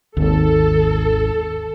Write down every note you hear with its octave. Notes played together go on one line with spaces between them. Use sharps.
G#1 D#2 A4